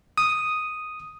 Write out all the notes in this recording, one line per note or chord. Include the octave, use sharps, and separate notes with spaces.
D#6